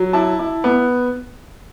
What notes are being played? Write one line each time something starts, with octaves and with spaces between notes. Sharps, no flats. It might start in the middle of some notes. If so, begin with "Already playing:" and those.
Already playing: F#3
E4 A5
E4
B3